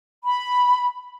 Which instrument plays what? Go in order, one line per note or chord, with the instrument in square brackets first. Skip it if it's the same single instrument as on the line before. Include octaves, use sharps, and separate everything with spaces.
[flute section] B5